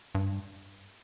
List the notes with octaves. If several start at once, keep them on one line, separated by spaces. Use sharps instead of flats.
G2